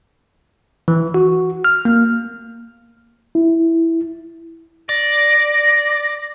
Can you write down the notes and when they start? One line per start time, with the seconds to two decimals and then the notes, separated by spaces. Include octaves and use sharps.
0.88 E3
1.14 F#4
1.65 F6
1.85 A#3
3.35 E4
4.89 D5 A#6